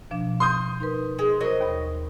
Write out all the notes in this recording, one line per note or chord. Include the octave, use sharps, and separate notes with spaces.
B2 F3 D4
C6 D#6 G6
D#4 A#4 B4
G#3
F#3 A#4 C5 D#5
D#2 B5